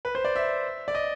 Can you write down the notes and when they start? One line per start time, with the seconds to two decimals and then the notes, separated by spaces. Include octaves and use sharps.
0.05 B4
0.15 C5
0.25 D5
0.36 E5
0.88 D5
0.95 D#5